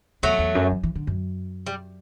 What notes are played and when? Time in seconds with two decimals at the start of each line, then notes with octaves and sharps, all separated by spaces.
0.23 E2 F#3 A3
0.39 E2
0.55 F#2
0.71 E3
0.83 E3
0.95 D3
1.07 F#2
1.66 G3